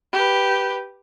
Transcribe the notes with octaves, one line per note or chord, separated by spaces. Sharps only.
G4 B4